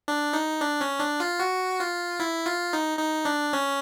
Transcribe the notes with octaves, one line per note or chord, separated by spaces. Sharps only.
D4
D#4
D4
C#4
D4
F4
F#4
F4
E4
F4
D#4
D#4
D4
C#4